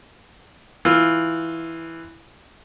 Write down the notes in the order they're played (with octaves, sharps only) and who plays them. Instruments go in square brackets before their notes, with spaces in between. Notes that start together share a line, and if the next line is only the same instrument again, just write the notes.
[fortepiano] E3 F4